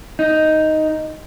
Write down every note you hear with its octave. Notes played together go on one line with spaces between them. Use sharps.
D#4